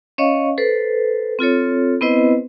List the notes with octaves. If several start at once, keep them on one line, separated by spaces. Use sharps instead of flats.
C#4 C#5 D#5 F5 C#6
A4 B4 C5
C4 F4 A4 C#5
B3 C4 E4 B4 C5 D#5